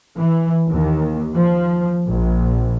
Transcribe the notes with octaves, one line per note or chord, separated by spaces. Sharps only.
E3
D#2
F3
A#1